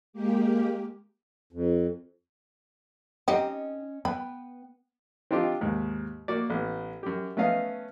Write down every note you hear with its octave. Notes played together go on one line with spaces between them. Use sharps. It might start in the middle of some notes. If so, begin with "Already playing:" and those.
G#3 A#3 G4
F2
C4 C#4 D#4 G4 D#5
B3 B4 G5 B5
C4 D4 D#4 F4 G4
D#2 G#2
A#3 F#4 D5
A1 B3
F#2 G4
A3 B3 C#4 D#5 F5